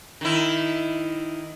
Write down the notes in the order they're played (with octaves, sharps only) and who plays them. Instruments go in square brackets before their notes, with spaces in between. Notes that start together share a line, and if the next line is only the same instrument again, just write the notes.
[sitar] D#3 E4